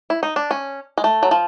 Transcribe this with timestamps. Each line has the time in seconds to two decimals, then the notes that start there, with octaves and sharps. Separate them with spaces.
0.10 E4
0.23 D#4
0.36 D4
0.51 C#4
0.98 G#3
1.04 A3
1.23 F#3
1.31 F3